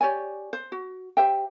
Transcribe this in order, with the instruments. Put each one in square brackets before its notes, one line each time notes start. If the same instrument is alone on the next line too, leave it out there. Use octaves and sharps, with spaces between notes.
[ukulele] G4 C#5 D5 G#5
C5
F#4
G4 C5 E5 G5